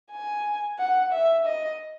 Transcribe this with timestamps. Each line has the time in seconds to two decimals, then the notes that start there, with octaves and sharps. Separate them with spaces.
0.11 G#5
0.79 F#5
1.12 E5
1.45 D#5